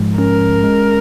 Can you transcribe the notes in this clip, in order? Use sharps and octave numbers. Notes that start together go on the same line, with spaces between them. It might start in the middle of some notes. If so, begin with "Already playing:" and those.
Already playing: G#2 F3 G#3
C#4 A#4
G#3